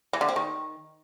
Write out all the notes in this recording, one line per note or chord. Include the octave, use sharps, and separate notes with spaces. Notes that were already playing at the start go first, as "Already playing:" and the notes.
E3
D3
C4
D#3